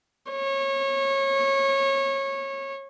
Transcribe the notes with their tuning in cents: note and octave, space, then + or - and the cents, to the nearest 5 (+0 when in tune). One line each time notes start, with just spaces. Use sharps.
C#5 -25